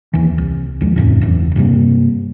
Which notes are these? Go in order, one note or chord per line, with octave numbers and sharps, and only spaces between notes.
D#2 E3
C2
D#2 F3 G#3
F2 A2 C#3
F#1 E2
G2 C3 G3 A#3